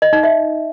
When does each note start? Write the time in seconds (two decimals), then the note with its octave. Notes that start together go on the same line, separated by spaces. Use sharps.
0.02 D#5
0.13 D#4
0.23 E5